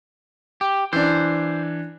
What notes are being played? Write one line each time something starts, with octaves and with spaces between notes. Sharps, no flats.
G4
E3 D4 C5